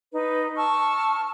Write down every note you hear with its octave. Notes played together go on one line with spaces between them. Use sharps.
D#4 B4
A5 C#6 E6 F6